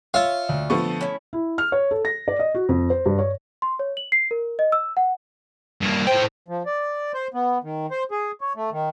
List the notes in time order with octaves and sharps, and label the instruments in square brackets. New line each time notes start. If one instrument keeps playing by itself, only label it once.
[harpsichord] F4 [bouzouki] C#5 E5
[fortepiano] D2
[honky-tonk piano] D3 F3 B3 [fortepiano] A3 C#6
[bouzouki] C#4 E4
[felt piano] E4
F6
C#5
A4
A#6
D5
D#5
F#4
F2
C5
G2
C#5
[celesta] C6
C#5
F#7
C7
A#4
D#5
E6
F#5
[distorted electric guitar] G2 A#3
[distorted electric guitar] A2 G5 [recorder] C5
[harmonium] F3
D5
C5
B3
D#3
C5
G#4
C#5
A3
D#3